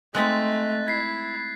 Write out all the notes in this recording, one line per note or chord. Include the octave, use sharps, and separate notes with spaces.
G#3 A3 C4 D#4 D#5 F#6 A6 B6
E4 G#6 B6 C7